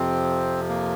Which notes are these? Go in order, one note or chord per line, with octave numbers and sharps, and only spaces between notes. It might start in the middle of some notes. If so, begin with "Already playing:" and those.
Already playing: F2 C3 F3 C4
A#3